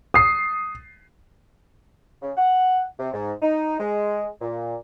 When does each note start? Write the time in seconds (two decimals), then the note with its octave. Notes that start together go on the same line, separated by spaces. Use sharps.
0.14 D#6 C7
2.22 C#3
2.37 F#5
2.99 C3
3.13 G#2
3.42 D#4
3.79 G#3
4.41 A#2